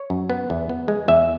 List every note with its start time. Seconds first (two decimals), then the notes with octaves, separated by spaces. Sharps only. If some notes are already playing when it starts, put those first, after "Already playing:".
Already playing: C#5
0.10 F#2
0.30 B3
0.50 E2
0.69 B3
0.88 G#3
1.08 E2 E5